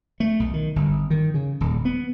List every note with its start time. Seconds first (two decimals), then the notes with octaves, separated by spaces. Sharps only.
0.20 A3
0.40 B1
0.53 D#3
0.76 G1
1.10 D#3
1.34 C#3
1.61 D#1
1.85 B3